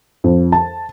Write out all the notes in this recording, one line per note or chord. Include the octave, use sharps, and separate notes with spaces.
F2
A5